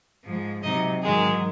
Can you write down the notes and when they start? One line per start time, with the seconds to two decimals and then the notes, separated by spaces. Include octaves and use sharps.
0.24 G#2 F3 G#3
0.63 C3 F#3 D#4 D#5
1.02 G#2 D#3 F#3 G#3 G#4